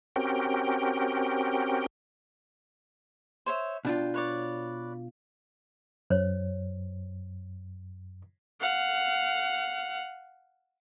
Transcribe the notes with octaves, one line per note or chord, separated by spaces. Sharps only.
C4 C#4 F#4 G4 A#4 G5
C5 C#5 E5
B2 D4 F4 G5
B4 C#5 D5
F#2 C5 C#5
F5 F#5